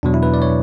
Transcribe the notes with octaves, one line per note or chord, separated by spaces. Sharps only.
E2 B2 F#3 D4
E4
B4
D5
C#5